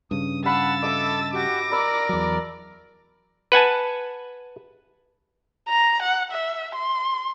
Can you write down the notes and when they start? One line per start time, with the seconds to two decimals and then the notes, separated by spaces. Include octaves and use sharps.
0.11 G2 C#3 D#6
0.45 F5 F#5 A5 B5 C#6 E6 A6
0.83 A4 D#5 E5 A5 D6
1.34 F#4 G4 D6 A#6
1.72 A#4 D5 B5 E6
2.09 E2 F#3
3.52 B4 F#5 G#5 A5
5.68 A#5
6.02 F#5
6.32 E5
6.75 C6